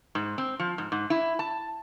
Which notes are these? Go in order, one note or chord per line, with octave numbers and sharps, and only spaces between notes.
G#2
C4
F3
G#2
G#2
E4
A5